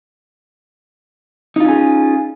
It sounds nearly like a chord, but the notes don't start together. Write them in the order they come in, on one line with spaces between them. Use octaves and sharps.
D#4 F4 C#4 G#4